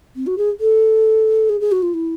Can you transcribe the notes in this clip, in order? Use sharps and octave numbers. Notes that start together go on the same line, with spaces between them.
C4
F#4
G#4
A4
G#4
G#4
F#4
F4
E4